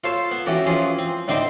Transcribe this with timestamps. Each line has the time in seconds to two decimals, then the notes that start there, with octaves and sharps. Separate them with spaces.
0.04 F4 A4 C5 C#5 A5
0.31 B3
0.46 E3 C#4 F#4 G4 A4
0.66 E3 F3 C#4 F4 G#4
0.99 C4
1.28 A2 D3 C4 D#4 C5 D6